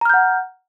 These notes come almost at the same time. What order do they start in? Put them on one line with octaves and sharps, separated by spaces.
A#5 F6 G6 F#5